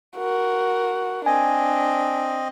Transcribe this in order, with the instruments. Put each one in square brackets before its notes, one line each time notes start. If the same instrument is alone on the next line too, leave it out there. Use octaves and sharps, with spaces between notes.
[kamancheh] F#4 A#4
[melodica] C4 D#5 [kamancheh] D4 [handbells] G#5